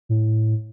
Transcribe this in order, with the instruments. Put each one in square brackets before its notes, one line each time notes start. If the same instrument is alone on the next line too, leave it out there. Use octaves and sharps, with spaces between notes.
[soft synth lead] A2